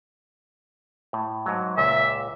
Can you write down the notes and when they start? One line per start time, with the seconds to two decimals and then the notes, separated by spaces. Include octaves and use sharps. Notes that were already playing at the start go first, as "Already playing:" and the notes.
1.13 A2
1.46 G#2 F#3
1.77 C#2 A#2 E5